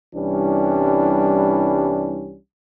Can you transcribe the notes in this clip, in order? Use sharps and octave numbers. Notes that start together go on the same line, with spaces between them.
C2 E3 G3 C#4 D4